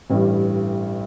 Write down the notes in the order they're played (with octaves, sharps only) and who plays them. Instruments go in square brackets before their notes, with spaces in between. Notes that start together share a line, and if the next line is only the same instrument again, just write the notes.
[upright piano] A1 G2 E3 G3